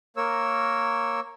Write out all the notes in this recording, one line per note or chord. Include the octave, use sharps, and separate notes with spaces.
A#3 A#4 C#5 E6